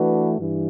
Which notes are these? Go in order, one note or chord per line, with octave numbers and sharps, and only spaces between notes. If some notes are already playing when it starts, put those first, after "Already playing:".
Already playing: E3 A3 D4 F#4 B4
G2 E3